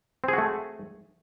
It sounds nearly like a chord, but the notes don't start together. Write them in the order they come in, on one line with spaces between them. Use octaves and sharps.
C4 G#4 F#4 A3